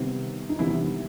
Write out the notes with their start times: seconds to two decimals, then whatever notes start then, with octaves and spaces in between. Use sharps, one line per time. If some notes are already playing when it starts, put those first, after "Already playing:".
Already playing: C3 D#3 G3 B3
0.49 D#4
0.59 C3 D#3 E3 G3 B3 E4